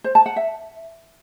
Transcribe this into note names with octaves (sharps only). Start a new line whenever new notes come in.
C5
A5
F#5
E5